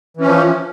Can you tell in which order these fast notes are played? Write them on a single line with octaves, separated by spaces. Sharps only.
E3 C#4 F3